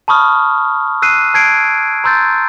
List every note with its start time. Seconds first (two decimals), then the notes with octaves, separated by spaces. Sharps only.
0.08 A5 B5 C#6 D#6 F6
1.02 E6 F#6 C7 D#7
1.34 A5 G#6 C7 D7
2.04 A#5 C6 E6 G6 A6